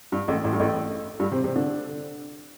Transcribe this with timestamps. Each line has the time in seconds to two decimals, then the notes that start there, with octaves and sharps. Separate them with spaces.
0.12 G2
0.28 A1 A2
0.44 A1 A2
0.53 G2
0.60 A1 A2
1.20 G2 G3
1.32 C3 C4
1.44 C3 C4
1.56 D3 D4